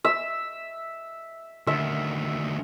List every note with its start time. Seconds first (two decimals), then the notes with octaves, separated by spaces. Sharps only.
0.04 E5
1.67 D2 D#3 E5